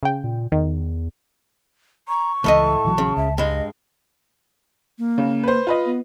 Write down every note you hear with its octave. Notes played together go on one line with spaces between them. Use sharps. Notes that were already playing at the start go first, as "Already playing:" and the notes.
C#3 G5
A#2
E2 D#3
A#5 C#6
C#2 A2 E3 A3 D#5 A5
A#1 E3 F#3
C#3
C#2 E5
G2 G#3 D#5
A#3
C#3
B4 C5
F4 B4 D#5
B3